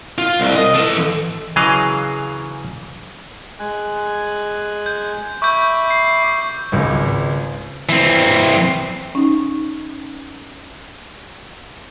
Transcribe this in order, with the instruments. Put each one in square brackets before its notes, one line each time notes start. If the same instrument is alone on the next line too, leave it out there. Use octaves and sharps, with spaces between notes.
[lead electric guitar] F4
C2
D#5
E3 A4
[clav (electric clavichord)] C#3 E3 F#3 G#4 D#5 F5
[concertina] G#3 G#5 F#6
[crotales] G6
[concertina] E5 B5 D6 [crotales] C#6 G6
[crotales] C7
[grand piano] G#1 C#2
[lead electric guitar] E3 C4
[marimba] C#4 D#4